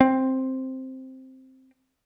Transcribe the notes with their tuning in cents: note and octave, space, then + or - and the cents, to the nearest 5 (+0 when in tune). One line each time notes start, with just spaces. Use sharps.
C4 +5